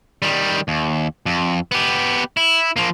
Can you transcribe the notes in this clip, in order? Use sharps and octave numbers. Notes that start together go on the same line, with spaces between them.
D#3 G3
D#2
F2
B3 G4
E4
F3 A#3